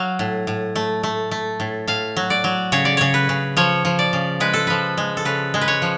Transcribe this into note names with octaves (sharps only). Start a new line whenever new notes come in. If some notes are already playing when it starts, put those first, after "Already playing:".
Already playing: F#3 F5
A2
A2
A3
A3
A3
A2
A2 F5
F#3
D5
F#3
C#3 C#5
D5
C#3 C#5
B4
C#3
F3 C#5
F3
D5
C#3
G#3 B4
A4
F3 B4
G#3
A4
C#3 B4
G#3
B4
C#5
F3